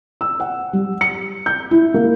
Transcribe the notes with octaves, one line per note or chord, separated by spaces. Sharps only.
E6
F#5
G3
C#7
G6
E4
A#3